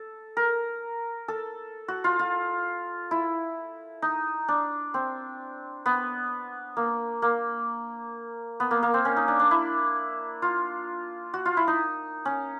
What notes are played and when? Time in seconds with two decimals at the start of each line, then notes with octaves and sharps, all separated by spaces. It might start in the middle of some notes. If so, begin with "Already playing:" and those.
Already playing: A4
0.37 A#4
1.28 A4
1.88 F#4
2.04 F4
2.19 F4
3.11 E4
4.02 D#4
4.48 D4
4.94 C4
5.86 B3
6.77 A#3
7.22 A#3
8.60 B3
8.71 A#3
8.83 A#3
8.94 C4
9.05 C#4
9.17 D#4
9.28 D4
9.40 D4
9.51 E4
10.42 F4
11.34 F#4
11.45 F4
11.57 E4
11.68 D#4
12.25 C#4